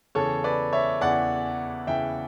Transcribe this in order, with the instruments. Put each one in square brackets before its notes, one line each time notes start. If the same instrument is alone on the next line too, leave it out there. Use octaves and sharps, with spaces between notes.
[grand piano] E2 C#3 E3 A4 C#5
B4 D5
C#5 E5
E2 C#3 E3 D5 F#5
E2 C#3 E3 E5 G5